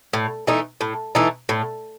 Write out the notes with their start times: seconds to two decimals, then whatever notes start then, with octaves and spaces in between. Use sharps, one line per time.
0.13 A2
0.47 E3 A3 D#4
0.81 A2
1.15 E3 A3 D#4
1.49 A2